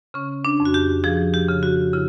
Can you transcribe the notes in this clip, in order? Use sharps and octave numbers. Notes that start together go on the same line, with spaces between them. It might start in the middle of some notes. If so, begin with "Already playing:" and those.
C#3 C#4
D4
F2
F#4
G4
F3 G#4
G4
C#3
F#4
C#3 E4